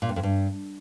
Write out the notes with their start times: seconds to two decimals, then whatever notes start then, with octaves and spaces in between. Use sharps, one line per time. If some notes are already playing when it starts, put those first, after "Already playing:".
0.02 A#2
0.09 G2
0.16 F2
0.23 G2